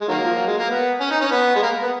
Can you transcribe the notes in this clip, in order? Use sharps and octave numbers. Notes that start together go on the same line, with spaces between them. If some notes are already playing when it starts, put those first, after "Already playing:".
G#3
D#3 F#3 A#3
F3
F#3
G#3
A#3
B3
C#4
D#4
C#4
B3
G#3
A#3
B3